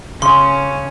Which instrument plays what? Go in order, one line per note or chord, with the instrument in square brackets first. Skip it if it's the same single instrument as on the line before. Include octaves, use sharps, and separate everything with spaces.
[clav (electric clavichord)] C#3 [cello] C#4 [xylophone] C6